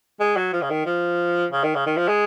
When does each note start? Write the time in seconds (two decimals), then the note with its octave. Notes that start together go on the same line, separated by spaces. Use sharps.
0.20 G#3
0.37 F#3
0.53 F3
0.62 C#3
0.70 D#3
0.86 F3
1.52 C#3
1.64 D#3
1.75 C#3
1.86 D#3
1.97 F3
2.08 G#3